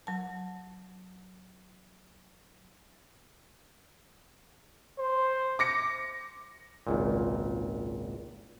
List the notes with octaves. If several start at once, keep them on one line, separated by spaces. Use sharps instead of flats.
F#3 A5
C5
D6 A#6 C#7
G#1 C#2 A#2